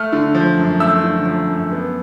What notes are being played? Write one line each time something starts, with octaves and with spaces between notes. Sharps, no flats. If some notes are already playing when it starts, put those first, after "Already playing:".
Already playing: A3 F6
D3
F3
F#2
A3 E6
D3
F3
F#2
B3